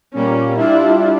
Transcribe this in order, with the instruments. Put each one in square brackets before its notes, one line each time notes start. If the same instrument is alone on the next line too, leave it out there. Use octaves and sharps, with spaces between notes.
[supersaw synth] A#2 G3 A#3 [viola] C#4
[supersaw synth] G3 D4 F4 [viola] E4